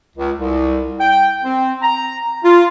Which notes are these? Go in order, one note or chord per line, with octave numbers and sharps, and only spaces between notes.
C#2
C2
G5
C4
A#5
F4